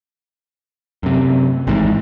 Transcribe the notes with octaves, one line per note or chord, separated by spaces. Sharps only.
F#2 C3
G#1 G#2 D3 E3